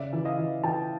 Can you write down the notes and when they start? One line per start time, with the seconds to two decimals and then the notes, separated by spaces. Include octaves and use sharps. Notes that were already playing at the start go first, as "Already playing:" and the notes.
Already playing: C#3 D5 E5
0.13 E3
0.25 D#5 F5
0.39 E3
0.64 E3 G5 A5